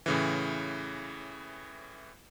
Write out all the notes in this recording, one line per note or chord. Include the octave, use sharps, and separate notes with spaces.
A2 C#3 E3